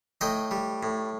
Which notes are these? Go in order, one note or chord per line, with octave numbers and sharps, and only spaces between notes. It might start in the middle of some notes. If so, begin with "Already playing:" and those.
A2 D#5 G5
G3
A2